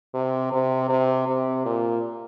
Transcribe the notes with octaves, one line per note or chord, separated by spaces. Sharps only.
C3
C3
C3
C3
A#2